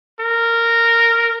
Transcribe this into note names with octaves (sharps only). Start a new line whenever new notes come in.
A#4